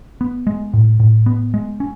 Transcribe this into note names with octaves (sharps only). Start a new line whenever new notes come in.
B3
G#3
A2
A2
B3
G#3
C#4